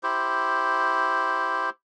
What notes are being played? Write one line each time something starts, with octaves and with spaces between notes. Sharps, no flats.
E4 G4 C5